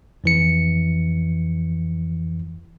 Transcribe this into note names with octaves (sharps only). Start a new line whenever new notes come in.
F2 E3 C#7